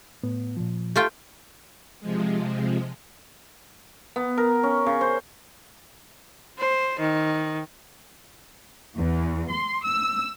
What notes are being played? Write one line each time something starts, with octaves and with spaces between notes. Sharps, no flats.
A2 B3
A#2 F3
A3 F4 G4 G5
C3 F3 G#3
B3
A#4
C#4
C#3
C5
C5
D#3
E2
C6
E6